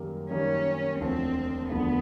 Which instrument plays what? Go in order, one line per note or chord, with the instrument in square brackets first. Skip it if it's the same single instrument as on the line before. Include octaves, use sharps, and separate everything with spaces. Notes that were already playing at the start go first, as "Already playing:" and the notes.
Already playing: [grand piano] F#2 D#3 G3 A#3
[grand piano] F#2 D#3 G3 A#3 [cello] C#4
[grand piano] E1 D2 D3 F3 [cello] C4
[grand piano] E1 D2 D3 F3 [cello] B3